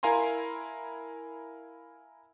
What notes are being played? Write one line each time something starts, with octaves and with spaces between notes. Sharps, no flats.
E4 A#4 F5 G#5 A#5 C6